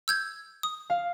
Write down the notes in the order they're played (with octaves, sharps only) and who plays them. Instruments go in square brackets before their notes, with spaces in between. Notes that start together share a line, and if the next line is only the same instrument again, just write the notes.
[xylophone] E6 G6 G#6
D#6
[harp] F5